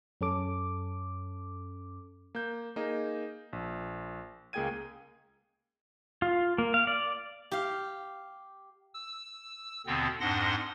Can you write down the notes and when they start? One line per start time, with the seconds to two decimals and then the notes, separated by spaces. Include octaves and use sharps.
0.21 F#2 C#4 A4 D6
2.35 A#3 G6
2.76 A#3 D#4 G#4 D#5 A#5
3.53 A#1
4.53 C#2 A#3 G#4 G5 G#6 D#7
6.22 F4
6.58 A#3
6.74 F5
6.87 D5
7.51 G4 F5
8.94 E6
9.86 D#2 B2 D3 B3 C4
10.20 F2 G#2 D4 F#5 C6 A#6